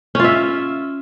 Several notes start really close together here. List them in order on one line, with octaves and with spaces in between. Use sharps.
C#4 F4 E5